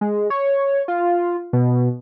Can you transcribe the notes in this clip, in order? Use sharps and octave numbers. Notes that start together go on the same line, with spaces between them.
G#3
C#5
F4
B2